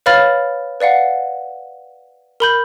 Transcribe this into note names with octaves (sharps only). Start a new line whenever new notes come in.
B4 C#5 F5 B5 F6 A6
B4 D5 F5 F#5
A#4 B5 G6